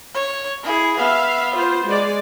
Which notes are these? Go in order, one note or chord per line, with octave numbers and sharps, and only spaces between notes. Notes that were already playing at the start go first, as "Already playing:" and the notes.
C#5
E4 G#4
B3 E5 F5
F4 C5
G#3 D5